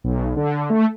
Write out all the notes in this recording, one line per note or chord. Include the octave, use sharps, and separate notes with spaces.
B1
D3
A3